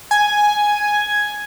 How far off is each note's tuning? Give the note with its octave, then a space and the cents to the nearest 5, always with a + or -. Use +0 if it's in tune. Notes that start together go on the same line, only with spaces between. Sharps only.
G#5 +5